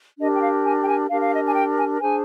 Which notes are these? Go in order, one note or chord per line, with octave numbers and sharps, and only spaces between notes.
D4 G4 A#4 D#5
G5
F5
G#5
G5
G#5
D4 G4 A#4 F5
F5
D#5
G#5
G5
G#5
D4 G#4 C5 G#5